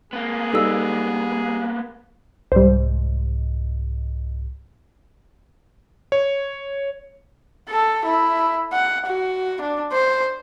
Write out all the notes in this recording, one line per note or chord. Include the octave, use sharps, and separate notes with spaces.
A#3 B3 G#4
G3 D#4 A4 B4 E6
C2 G#2 G3 C5
C#5
A4
E4
F#5
F#4
D4
C5